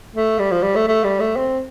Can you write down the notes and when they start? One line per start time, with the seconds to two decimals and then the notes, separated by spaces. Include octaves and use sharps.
0.15 A3
0.39 G3
0.51 F3
0.63 G3
0.76 A3
0.87 A3
1.04 G3
1.20 A3
1.37 C4